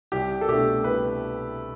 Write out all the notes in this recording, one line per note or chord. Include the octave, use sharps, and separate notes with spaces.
C2 G4
A4
B2 A3 D4 G4
C2 B4